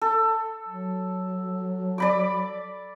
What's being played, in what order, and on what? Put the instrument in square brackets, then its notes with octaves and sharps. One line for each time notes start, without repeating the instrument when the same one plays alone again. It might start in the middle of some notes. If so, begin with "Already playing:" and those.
[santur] A4
[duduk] F#3
[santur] D5 B5 D6